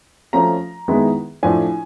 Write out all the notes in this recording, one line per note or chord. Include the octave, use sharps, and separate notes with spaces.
F3 A3 C#4 A#5
D#3 G#3 B3 E4
A2 F3 A3 D4 F4 G#5